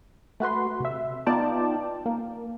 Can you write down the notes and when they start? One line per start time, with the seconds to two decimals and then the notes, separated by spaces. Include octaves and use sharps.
0.40 A3 F#4 B4 C6
0.80 C3 E5
1.27 B3 D#4 F4 D5 G5 A5
2.06 A#3